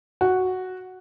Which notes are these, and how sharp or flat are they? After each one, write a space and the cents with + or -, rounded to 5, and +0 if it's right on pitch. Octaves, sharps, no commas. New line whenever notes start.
F#4 +0